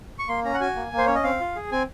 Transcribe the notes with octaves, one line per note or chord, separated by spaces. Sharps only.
C#6
A#3 C6
C#4 A#5
F#5
F#4 G#5
A#3
A#3
C5
C#4 C#5
D#5
C4 F5
F4
G#4
C4 G#5